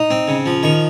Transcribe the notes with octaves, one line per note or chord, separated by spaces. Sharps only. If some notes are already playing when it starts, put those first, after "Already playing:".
Already playing: D#4
C4
C#3
F3
D#3 C#6